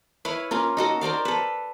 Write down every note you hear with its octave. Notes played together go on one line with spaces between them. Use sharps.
E4 B4 C#5 F5
A#3 C#4 F4
D#4 F#4 A4
A#4 C5 D5 F5
A4 B4